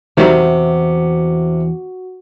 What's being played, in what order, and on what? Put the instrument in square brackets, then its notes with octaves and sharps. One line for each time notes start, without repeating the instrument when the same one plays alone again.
[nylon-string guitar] E2 E3 D#5 [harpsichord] C3 [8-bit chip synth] D#3 F#3 G3 [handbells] F#4